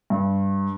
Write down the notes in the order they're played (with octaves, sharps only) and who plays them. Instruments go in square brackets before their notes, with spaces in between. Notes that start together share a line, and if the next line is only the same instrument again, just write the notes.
[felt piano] G2